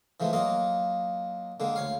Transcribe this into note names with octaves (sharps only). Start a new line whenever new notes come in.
E3 F3 G#3 A3
F#3 A#3 F4 D#5
D3 G#3 A#3
D2 C#5 F5